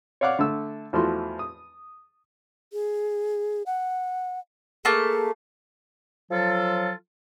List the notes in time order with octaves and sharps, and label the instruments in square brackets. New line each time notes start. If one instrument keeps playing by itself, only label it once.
[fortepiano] C#5 D5 F5 F#5 D6
D3 A3 A5 E6
E2 F3 A3 F#4 C6
D#6
[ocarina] G#4
F#5
[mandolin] A3 A#3 A5 [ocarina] G#4
[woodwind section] F3 F#3 F4 A4